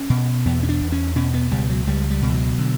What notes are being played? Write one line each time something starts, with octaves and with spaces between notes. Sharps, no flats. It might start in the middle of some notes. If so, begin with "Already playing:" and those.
Already playing: C#4
B2
E2 B3
C#4
D4
E2
C#4
B2 C#4
B3
C#2 G3
F#3
C#2 G3
G3
B2
E3
F#3
D3